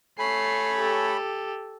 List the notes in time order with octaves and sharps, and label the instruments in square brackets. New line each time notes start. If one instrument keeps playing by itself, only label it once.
[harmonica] A3 C#5 G#5 [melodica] B5 [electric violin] C7
[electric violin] G4 A4